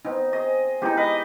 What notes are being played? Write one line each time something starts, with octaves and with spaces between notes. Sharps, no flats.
B3 C4 D#4 D#5
G#4 C5 D#5
G#4
G#3 B3 D#4 E4 G4
B4 D#5 G5